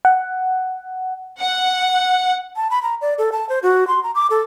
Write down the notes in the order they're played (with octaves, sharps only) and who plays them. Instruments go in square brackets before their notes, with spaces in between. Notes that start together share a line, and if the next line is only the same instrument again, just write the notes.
[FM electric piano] F#5
[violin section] F#5
[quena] A5
B5
A#5
D5
A4
A5
C5
F#4
C6
A#5
D6
A4